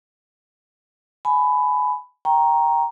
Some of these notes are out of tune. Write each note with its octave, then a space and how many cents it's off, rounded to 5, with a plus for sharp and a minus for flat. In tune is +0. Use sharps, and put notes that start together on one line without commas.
G#5 +25 B5 +10
G5 +0 A#5 +5 C#6 -25